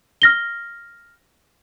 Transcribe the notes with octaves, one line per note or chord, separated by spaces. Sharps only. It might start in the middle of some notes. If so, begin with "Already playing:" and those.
F6 A#6 G7